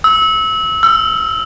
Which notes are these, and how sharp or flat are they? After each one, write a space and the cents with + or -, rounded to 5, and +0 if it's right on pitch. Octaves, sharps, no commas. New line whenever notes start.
E6 -25
E6 +35